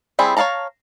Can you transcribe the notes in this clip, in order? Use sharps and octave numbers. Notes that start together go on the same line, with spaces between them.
G3 C4 E4 G#4
C#5 D5 F5 A5 A#5